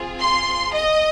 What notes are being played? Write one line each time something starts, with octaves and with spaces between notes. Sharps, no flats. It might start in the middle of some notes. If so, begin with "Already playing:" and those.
Already playing: C4 F4 G#4
C6
D#5